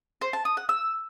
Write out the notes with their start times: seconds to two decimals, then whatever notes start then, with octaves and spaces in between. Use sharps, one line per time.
0.21 C5
0.33 A5
0.45 D#6
0.57 F#5
0.69 E6